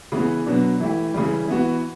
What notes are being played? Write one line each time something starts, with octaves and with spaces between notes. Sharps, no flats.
C#3 E3 B3
B2 F#3 B3 D4
E3 A3 E4 G4
C#3 E3 G3
E3 B3 F#4